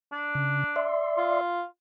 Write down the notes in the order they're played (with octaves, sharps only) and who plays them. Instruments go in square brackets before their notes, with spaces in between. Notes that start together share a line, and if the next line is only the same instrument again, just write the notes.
[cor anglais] D4
[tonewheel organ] C#3
D5 E5 C6
[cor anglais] F4